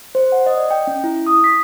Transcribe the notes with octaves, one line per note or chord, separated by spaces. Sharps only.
C5
F#5
D#5
D5
G5
C#4
E4
D#6
B6